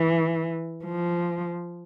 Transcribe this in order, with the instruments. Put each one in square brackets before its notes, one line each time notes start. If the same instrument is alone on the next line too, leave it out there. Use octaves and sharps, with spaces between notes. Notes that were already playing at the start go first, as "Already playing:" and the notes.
Already playing: [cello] E3
F3